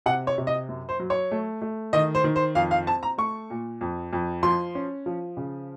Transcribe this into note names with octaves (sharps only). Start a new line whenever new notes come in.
C3 F#5
C#5
C3
D#5
F#2
C5
F#3
C#5
A3
A3
D#3 D#5
C5
D#3
C5
F2 F5
F5
C4 A5
A#5
A3 C#6
A#2
F2
F2
F3 C6
C#4
F3
C#3